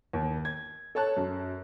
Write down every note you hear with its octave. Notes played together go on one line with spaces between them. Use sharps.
D#2
G#6
A4 C#5 A5 F#6
F#2